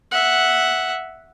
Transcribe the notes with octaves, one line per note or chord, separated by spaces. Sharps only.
E5 F#5